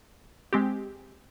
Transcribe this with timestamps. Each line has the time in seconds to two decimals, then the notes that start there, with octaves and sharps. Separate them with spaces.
0.53 G#3 C4 G4